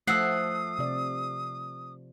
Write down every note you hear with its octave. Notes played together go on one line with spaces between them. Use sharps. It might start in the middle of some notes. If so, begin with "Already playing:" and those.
F3 A3 F#5 D#6 E6 C7
C3 D5